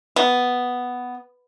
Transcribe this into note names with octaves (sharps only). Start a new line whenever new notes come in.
B3